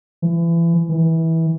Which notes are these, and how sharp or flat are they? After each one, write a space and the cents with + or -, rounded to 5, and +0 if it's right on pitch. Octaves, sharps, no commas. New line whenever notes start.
E3 +30
E3 -20